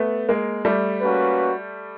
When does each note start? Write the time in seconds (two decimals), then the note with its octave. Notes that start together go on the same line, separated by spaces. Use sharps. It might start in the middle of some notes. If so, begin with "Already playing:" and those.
Already playing: A3 B3
0.29 G#3 A#3
0.65 G3 A3
1.01 A#3 C#4 F#4 B4